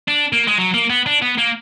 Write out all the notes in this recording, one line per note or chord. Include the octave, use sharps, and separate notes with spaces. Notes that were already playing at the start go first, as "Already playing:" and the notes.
D4
A#3
G#3
F#3
A#3
B3
D4
B3
A#3